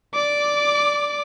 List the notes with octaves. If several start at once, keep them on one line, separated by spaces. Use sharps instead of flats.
D5 D6